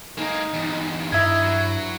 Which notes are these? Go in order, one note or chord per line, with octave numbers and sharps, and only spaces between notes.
G#3 A#3 D#4
E2 G2
G2 E4 A#4 D#5 E5 G#6
F#3